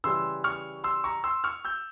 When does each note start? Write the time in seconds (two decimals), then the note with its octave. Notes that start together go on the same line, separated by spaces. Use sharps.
0.04 C#3 E3 G3 C6 E6
0.44 C#6 F6
0.84 C6 E6
1.04 A#5 C#6
1.24 C6 E6
1.44 C#6 F6
1.65 E6 G6